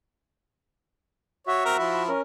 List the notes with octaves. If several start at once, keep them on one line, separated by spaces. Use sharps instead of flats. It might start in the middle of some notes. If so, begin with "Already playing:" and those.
F#4 C#5 E5
C4 A#4
F3 E4
C#4 A#4